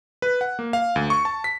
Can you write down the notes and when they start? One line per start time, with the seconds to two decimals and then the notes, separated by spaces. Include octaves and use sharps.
0.22 B4
0.41 F#5
0.59 A#3
0.73 F5
0.96 D2
1.10 C#6
1.25 A5
1.44 B6